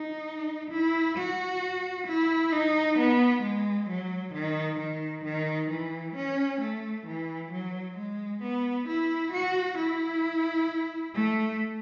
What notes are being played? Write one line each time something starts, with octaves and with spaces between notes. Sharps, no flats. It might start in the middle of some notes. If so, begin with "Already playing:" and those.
Already playing: D#4
E4
F#4
E4
D#4
B3
G#3
F#3
D#3
D#3
D#3
E3
C#4
A3
E3
F#3
G#3
B3
E4
F#4
E4
A3